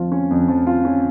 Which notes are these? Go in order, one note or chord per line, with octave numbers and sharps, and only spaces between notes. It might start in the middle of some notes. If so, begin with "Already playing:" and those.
Already playing: F2 F3 F4
C#4
F2
F3
F4
C#4